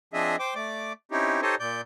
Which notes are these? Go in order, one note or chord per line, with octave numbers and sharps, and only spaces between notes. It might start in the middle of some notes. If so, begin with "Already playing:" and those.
F3 C4 D4 G#4 D#5 E5
C5 G5 D6
A3 D5 D6
C4 C#4 D#4 E4 G4
D#4 G4 A4 C5 C#5 D#5
A#2 D5 G6